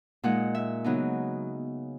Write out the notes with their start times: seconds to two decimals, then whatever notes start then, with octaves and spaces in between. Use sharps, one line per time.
0.24 A#2 G#3 D#4 F#5
0.55 E5
0.84 C#3 F#3 B3 D#4